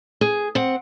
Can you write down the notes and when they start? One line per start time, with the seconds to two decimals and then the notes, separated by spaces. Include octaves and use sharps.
0.21 G#4
0.55 C4 F#5